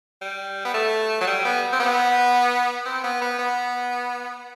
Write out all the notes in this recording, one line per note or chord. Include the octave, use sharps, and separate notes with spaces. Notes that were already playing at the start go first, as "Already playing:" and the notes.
G3
B3
A3
F#3
G3
B3
C4
B3
C4
B3
B3
B3